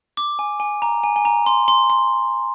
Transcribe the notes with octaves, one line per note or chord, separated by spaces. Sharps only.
D6
G#5
G#5
A#5
G#5
G#5
A#5
C6
C6
C6